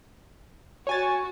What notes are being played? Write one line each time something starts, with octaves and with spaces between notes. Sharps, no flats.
F#4 C#5 G#5 A6